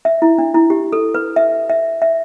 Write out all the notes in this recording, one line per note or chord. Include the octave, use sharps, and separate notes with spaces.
E5
E4
D4
E4
G4
A4
B4
E5
E5
E5